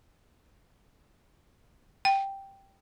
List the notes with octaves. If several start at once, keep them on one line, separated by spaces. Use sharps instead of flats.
G5